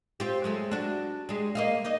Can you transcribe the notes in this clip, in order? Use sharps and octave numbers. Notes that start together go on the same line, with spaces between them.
C4 F4 G4
F#3 G#3 A3
D4 F#4
G3 G#3
A#3 D#5 F5
A#3 D#4 D#5